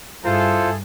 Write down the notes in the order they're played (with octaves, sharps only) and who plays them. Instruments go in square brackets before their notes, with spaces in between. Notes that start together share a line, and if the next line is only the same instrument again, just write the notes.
[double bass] G2 [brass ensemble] E4 G#4 A4 [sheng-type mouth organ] F4 C5